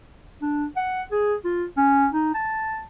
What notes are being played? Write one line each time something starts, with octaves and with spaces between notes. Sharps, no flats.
D4
F#5
G#4
F4
C#4
D#4
A5